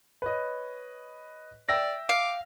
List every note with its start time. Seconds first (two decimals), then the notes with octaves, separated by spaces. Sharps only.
0.22 B4 C#5 D#5
1.69 D5 E5 G5 E6 A#6
2.09 F5 D6